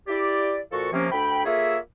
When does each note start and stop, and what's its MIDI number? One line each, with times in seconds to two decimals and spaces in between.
0.08 0.60 64
0.08 0.60 67
0.08 0.60 74
0.72 0.88 46
0.72 0.88 53
0.72 0.88 66
0.72 0.88 69
0.72 0.88 85
0.93 1.08 48
0.93 1.08 53
0.93 1.08 58
0.93 1.08 61
1.12 1.43 38
1.12 1.43 79
1.12 1.43 83
1.45 1.77 58
1.45 1.77 65
1.45 1.77 68
1.45 1.77 69
1.45 1.77 73
1.45 1.77 76